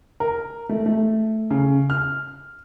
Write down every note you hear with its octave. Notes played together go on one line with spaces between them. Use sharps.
A#4
A3
A3
C#3
F6